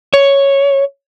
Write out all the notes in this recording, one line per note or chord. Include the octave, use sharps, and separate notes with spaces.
C#5